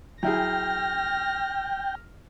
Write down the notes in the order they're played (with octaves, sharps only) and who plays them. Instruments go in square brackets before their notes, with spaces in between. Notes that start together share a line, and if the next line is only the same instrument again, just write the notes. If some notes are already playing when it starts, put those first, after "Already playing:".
[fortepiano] F#3 E4 G#4 [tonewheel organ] G5 [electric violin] F6 A#6